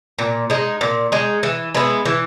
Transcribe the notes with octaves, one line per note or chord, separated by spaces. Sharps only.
A#2
G#3 D#4
A#2
G#3 D#4
E3
G#3 B3 E4
E3